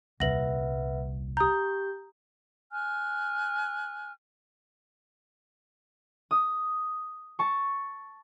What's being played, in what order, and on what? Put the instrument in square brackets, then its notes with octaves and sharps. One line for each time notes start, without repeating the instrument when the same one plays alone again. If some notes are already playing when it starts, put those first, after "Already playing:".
[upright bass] D#1 C2 [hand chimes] B4 E5 F#5 [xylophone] A#6 F#7
[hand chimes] G4 G6 [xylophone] A#5 D#6
[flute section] G#5 F6 F#6
[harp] D#6
A5 C#6